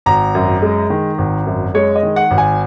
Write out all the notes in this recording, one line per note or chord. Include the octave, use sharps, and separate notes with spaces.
G#1 A#5
F#2
G#3
D#3
G#1
F#2
G#3 C#5
D#5
D#3
F#5
G#1
G#5